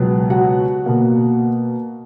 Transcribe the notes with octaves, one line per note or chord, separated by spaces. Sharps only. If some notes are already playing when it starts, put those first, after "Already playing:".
Already playing: C#2 B2 F#3 B3
F#4 F#5
B2 A#3